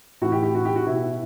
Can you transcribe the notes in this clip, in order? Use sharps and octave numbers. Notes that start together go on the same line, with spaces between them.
A2 E3 F#4
G4
G4
F#4
G4
F#4
B2 E4